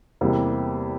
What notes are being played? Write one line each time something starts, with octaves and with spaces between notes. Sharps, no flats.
E2 C3 G3 A#3